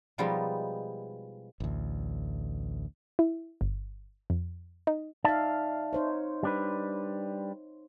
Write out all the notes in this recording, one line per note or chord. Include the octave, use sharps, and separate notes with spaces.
B2 F3 G3 G#3 B3 D#4
A1 D2
E4
G1
F2
D#4
D#4 D5 E5 F5 A5
D#4 C5 C#5
G3 D4 B4